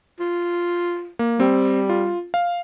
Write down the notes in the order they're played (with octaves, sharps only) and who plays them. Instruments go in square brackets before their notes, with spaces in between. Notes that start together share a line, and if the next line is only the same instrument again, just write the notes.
[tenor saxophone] F4
[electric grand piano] A#3
[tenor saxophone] G3 [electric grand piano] C4
[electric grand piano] F4
F5